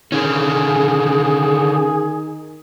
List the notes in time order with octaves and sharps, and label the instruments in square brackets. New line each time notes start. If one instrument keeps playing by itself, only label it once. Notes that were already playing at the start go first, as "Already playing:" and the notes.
[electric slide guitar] D3 C#4 [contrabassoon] D#3 [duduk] G#4